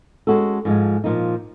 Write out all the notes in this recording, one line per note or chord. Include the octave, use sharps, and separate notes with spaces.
G#3 C#4 F#4 A4
G#2 F3 G#3
A#2 F3 A#3 D#4